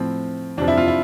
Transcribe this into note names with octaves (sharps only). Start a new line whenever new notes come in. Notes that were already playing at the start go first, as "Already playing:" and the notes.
Already playing: A2 F3 C4
F2 C3 F3 D4
E4
F4
E4